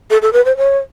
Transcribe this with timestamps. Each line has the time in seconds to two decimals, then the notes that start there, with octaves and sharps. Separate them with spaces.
0.11 A4
0.22 A4
0.33 B4
0.45 C5
0.57 C#5